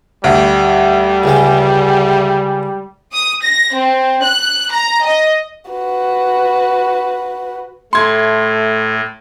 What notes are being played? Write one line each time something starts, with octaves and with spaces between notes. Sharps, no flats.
D2 G3
C#2 G#3
D#6
A#6
C4
F#6
A#5
D#5
F#4 B4
A2 A3 C6 G#6